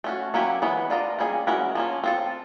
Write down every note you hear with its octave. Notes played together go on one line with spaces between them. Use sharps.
A3 C#4 F#4
F#3 A#3 C#4 E4 G4
E3 G#3 B3
D4 F4 A#4 D#5
G3 A#3 C#4 E4 G#4
E3 G#3 C#4 F#4 A#4
F3 A#3 C#4
C4 F4 A4